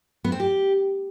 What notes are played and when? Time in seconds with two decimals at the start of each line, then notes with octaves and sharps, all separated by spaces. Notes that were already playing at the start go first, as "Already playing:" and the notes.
0.24 B3
0.32 C4
0.40 G4